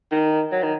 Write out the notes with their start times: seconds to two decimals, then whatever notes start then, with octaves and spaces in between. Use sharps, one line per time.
0.12 D#3
0.52 F#3
0.63 D#3